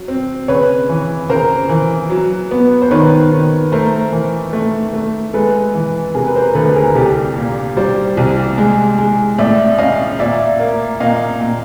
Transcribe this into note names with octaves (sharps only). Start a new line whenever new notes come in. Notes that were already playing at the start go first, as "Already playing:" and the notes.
Already playing: F#3
C4
C#3 B4 C#5
E3
C#3 A#4 C5
E3
F#3
B3
C5
D#3 B4 C#5
D#3
A3 A#4 C5
E3
A3
A3
G#3 A4 B4
E3
C3 G#4 A#4
B4
A#4 C5
D2 A4 B4
G#4 A#4
C2 G4 A4
A#2
G3 C5 D5
C2
G#3
G#3
A2 D5 E5
C#4 D#5 F5
A#2 D5 E5
A#3
A#2 D#5 F5
A#2